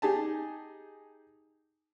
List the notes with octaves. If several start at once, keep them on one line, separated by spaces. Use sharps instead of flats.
D#4 G4 G#4 G#5 A5